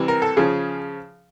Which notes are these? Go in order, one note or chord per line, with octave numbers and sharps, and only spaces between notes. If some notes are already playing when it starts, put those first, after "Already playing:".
Already playing: C3 E3 G3
A#4
A4
C#3 F3 G#4